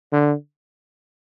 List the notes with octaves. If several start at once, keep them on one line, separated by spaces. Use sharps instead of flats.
D3